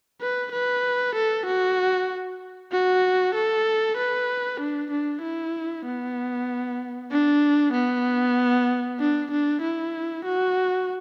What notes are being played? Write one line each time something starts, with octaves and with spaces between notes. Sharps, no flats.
B4
B4
A4
F#4
F#4
A4
B4
D4
D4
E4
B3
D4
B3
D4
D4
E4
F#4